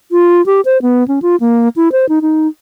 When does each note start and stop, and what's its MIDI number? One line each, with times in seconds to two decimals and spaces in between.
0.12 0.44 65
0.46 0.61 67
0.65 0.81 72
0.82 1.06 59
1.08 1.20 61
1.22 1.36 65
1.40 1.69 58
1.76 1.92 64
1.92 2.08 72
2.09 2.19 63
2.22 2.47 63